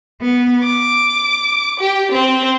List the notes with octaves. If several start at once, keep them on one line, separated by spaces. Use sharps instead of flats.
B3
D6
G4
C4